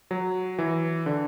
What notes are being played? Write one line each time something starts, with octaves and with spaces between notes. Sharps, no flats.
F#3
E3
D3